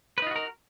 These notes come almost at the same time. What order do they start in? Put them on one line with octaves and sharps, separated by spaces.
B4 D#4 F4 F#4 A#4